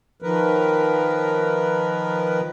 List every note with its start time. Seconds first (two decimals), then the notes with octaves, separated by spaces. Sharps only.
0.22 D#3 F3 A#4 B4